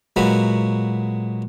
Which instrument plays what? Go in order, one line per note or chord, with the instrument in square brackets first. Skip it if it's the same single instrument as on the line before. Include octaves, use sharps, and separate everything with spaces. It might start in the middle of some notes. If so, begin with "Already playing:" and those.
[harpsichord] A#2 F#3 G#3 F#4 B4